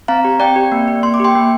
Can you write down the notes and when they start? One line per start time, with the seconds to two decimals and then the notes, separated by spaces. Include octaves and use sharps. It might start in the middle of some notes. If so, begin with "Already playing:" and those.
0.08 C4 F5 A#5
0.25 G4
0.40 C4 D5 G5
0.56 G4
0.72 A#3
0.88 G4
1.03 A#3 C6
1.14 D6
1.20 G4 G5 C6
1.35 A#3